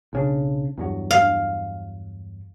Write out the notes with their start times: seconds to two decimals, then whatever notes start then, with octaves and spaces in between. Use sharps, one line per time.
0.13 B1 C#3 D4
0.78 E2 G2 F#3
1.11 F5